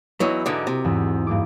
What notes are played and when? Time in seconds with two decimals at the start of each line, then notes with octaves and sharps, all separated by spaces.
0.20 E2 E3 F#3 E4 F#4 D#5
0.46 G#2 D3 E3 A#4 D#5 D6
0.67 C3
0.84 E2 G#2
1.27 G2 A#3 D6